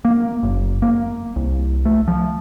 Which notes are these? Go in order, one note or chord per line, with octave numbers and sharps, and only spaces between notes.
A#3
F#1
A#3
C2
A3
F3